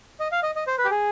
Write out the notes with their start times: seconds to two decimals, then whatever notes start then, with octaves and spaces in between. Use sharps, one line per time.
0.20 D#5
0.32 F5
0.43 D#5
0.56 D#5
0.67 C5
0.78 B4
0.85 G4
0.91 G#4